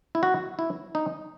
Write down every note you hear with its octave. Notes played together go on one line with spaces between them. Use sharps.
E4
F#4
E4
D#4